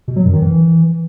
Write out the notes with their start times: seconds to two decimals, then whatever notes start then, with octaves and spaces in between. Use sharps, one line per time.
0.08 B2
0.16 F#3
0.25 F#2
0.33 D#3
0.41 E3